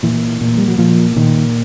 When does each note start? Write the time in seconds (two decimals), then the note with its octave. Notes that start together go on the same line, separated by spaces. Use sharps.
0.03 A#2 E3
0.41 A#2
0.58 G3
0.68 F#3
0.78 A#2 F3
1.16 A#2 D#3